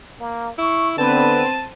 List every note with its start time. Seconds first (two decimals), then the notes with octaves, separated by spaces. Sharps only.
0.20 A#3
0.58 E4 C#6
0.98 D3 B3 C4 B4 A5 D#7